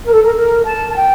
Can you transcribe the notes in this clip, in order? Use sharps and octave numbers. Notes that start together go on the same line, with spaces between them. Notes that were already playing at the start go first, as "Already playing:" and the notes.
A#4
A4
A#4
A#4
A5
A5
G5